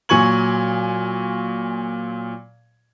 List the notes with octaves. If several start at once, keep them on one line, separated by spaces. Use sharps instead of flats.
A#2 F#3 G#5 C#6 G#6 F#7